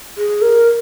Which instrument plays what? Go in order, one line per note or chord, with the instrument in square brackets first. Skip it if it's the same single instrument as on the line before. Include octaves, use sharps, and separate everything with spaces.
[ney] G#4
A#4